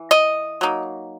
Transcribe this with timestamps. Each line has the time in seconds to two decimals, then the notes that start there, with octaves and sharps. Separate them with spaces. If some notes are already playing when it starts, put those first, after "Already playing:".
Already playing: E3
0.11 D#5
0.61 F#3 A#3 D#4